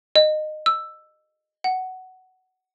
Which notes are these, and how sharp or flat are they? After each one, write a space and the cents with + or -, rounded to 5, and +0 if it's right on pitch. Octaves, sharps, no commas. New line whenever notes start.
D#5 -20
E6 +5
F#5 +10